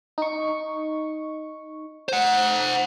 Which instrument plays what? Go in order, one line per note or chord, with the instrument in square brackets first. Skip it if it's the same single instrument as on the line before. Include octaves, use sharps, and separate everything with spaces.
[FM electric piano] D#4 C#6
[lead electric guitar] C5 F#5